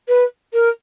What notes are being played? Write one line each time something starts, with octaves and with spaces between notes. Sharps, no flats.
B4
A#4